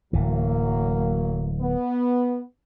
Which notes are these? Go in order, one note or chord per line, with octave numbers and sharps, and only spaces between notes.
D1 E3 F#3 A#3
B3